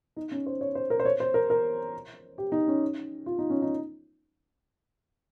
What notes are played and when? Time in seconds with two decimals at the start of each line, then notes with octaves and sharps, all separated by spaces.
0.16 D#4
0.32 C#4
0.46 C5
0.61 C#5
0.75 C5
0.90 A#4
0.99 C5
1.05 C#5
1.20 C5
1.34 A#4
1.50 A#4
2.38 G4
2.52 D#4
2.68 C#4
3.26 F4
3.38 D#4
3.50 C#4
3.62 D#4